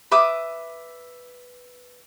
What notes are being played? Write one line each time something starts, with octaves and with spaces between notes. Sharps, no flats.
B4 E5 D6 D#6